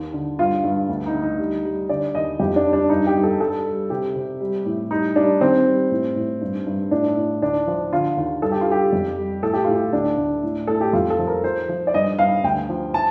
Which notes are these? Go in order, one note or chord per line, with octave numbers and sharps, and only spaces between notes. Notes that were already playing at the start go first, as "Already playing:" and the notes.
Already playing: D#2
D3
G2 F4
G2
D2
D#4
D2
D#4
G3
G3
D3 D5
D#2 D#5
F2 G4
D4
G3
D4
G2 D#4
G4
G2
A4
G3 A4
G3
C3 G4
C3
G3
A2
G3 D#4
G3 D4
D#3 C4
G3
A2
A2
G2
G2
A2 D4
A2
D2 D4
F3
D3 F4
D#2
G2 A4
G4
F4
G3 G4
F2
G3
A2 A4
G4
A2 F4
G4
D2 D4
D2
A2
A2 A4
G4
F2 F4
A4
F3
A#4
F3 C5
F3
D5
G2 D#5
G2 F5
D2 G5
F3
A5